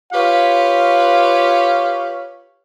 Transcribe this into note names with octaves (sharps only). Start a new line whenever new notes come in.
F4 G4 B4 C#5 F5